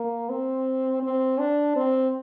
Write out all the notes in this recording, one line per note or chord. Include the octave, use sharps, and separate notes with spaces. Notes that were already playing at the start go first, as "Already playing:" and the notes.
Already playing: A#3
C4
C4
D4
C4